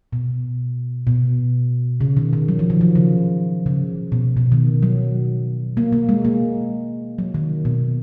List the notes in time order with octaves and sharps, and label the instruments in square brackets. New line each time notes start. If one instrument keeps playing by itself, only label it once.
[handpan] B2
B2
C#3
D#3
D#3
F#3
F3
D#3
F3
C#3
C#3
B2
B2
D#3
F#3
A#3
A#3
G#3
A#3
F#3
D#3
B2